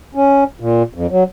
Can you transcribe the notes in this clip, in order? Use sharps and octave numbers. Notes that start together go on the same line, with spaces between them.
C#4
A#2
F2
F#3